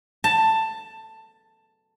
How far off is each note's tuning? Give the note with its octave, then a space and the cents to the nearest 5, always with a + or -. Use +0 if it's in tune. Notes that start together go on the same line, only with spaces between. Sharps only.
A5 +10